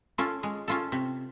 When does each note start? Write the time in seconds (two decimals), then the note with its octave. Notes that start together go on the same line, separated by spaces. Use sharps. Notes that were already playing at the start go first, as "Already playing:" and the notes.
0.18 C#4 F4 A4
0.43 G#3
0.68 C#4 F4 A4
0.92 C3